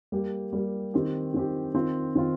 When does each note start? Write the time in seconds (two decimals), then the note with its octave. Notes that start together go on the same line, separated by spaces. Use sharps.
0.12 G3 A#3 G4
0.53 G3 A#3 G4
0.94 D#3 C4 G4
1.34 D#3 C4 G4
1.74 D#3 C4 F4
2.15 D#3 C4 F4